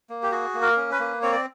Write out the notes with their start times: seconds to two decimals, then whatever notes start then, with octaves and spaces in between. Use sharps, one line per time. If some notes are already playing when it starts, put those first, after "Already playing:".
0.10 A#3
0.23 G4
0.32 F#4 G#4
0.54 A#3
0.62 A#4
0.77 C#4
0.92 B4
0.99 A#3
1.22 C4 C#5
1.32 D5